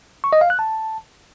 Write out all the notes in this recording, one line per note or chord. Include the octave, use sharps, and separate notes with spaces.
C#6
D#5
F5
F#6
A5